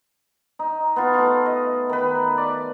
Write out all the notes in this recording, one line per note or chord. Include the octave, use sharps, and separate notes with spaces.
D#4
B3 F4
A3 F4
D#5
D#3 B4
D5